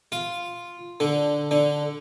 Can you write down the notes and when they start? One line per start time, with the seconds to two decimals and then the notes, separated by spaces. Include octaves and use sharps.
0.12 F4
1.00 D3
1.51 D3